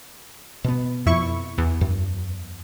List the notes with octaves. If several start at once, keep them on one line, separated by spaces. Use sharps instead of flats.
B2 B3
F2 E4 C#6
E2
F#2